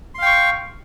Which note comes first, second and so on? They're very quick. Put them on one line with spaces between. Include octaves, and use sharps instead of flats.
C6 F5 G5 C#6